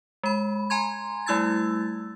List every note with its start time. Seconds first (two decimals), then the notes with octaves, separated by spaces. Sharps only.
0.23 G#3 B5
0.70 G#5 A#5 C6 G#6
1.26 G3 A3 E4 E6 G#6 A6